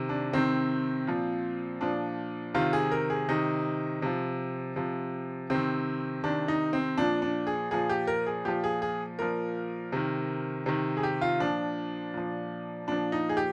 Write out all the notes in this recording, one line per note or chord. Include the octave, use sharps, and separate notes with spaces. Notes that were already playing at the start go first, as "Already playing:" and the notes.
Already playing: C3 D#3
D4
C3 D#3 C4
A#2 F3
A#2 F3 D4
C3 D#3 F4
G#4
A#4
G#4
C3 D#3 D#4
C3 F3
C3 F3
C3 D#3 C4
C3 D#3 D4
D#4
C4
A#2 F3 D4
D4
G#4
A#2 F3 G#4
G4
A#4
G#4
A#2 F3 G4
G#4
G#4
A#2 F3 A#4
C3 D#3
C3 D#3
G#4
G4
F4
A#2 F3 D4
A#2 F3
A#2 F3 D4
D#4
G#4
G4